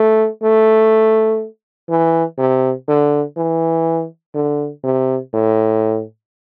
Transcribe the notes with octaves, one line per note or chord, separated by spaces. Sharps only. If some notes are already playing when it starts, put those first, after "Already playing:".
Already playing: A3
A3
E3
C3
D3
E3
D3
C3
A2